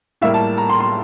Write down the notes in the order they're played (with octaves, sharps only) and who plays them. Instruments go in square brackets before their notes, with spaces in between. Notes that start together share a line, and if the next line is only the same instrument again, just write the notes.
[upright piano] A2 G3 A#3 E5
A5
A#5
C6
C6